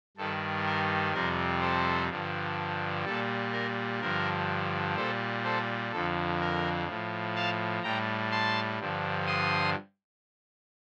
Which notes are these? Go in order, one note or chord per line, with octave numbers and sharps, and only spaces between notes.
G2 D#3 G3 A4
A#4
F2 C3 G3 A#4
A4 C5
G2 D3 F3
A#2 G3 A4
A#4
G2 D3 F3 A#4
A#2 G3 A4 C5
A4 C5
F2 D3 F3 A4
A#4
A2 F3
F5 A5
A2 G3 G5 A#5
A5 C6
G2 D3 F3
C6 D#6